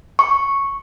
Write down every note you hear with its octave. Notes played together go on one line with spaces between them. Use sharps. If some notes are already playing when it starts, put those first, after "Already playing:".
C#6